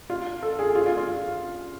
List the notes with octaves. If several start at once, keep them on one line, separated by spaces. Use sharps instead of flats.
F4
A4
G#4
F4
F4
F4